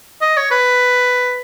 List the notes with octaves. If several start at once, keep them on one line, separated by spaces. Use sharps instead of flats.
D#5
C#5
B4